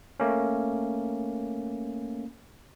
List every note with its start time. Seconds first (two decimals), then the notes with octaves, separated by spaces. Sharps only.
0.20 A3 A#3 C#4